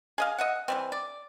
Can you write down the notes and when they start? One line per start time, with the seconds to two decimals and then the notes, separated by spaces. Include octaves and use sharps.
0.18 G#4 D#5 F5
0.38 D#5 E5 F#5
0.68 E3 G3 C4
0.92 D5